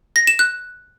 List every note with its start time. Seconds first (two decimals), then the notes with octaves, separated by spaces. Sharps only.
0.16 A#6
0.27 E7
0.39 F#6